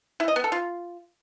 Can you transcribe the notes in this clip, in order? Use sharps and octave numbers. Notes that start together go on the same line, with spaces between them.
E4
D#5
B3
A4
F4